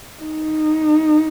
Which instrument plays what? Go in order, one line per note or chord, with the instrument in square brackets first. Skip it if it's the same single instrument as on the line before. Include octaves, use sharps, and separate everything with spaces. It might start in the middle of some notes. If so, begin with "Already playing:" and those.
[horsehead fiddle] D#4